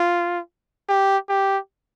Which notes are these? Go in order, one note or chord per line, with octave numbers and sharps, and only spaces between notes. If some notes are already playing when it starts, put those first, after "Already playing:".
Already playing: F4
G4
G4